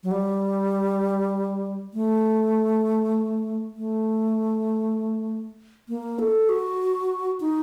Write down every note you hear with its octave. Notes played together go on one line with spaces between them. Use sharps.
F#3
G3
A3
A3
A#3
A4
F#4
D#4